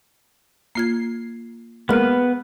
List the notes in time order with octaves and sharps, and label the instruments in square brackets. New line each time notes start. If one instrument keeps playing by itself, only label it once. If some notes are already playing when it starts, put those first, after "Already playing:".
[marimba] A#3 F4 G#6 [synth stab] C7
[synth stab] G#3 A#3 [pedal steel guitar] B3 B4 [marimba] B5 F6